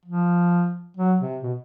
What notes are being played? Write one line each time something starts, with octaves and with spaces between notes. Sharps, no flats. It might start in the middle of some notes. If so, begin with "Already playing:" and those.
F3
F#3
C3
B2